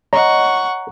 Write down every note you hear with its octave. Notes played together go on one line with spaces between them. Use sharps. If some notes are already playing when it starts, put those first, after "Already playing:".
C#5 D#5 F#5 A#5 C#6